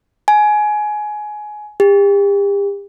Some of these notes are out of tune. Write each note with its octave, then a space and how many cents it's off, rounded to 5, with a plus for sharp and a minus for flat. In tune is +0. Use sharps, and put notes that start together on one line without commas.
G#5 +20
G4 +40